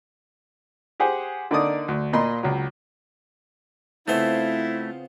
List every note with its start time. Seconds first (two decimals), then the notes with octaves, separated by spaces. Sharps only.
1.00 G4 G#4 C5 F#5 G#5
1.51 D3 A#3 D4 D#4 D5 D#6
1.88 D2
2.13 A#2 A#3 F4 D#5 B5 C6
2.43 C#2 F#3
4.08 C#3 A3 B3 C4 E4 F4 C5